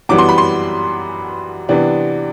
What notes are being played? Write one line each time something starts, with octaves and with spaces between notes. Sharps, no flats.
F#2 E3 G3 B3 D6
C6
B5
C6
C3 E3 B3 D4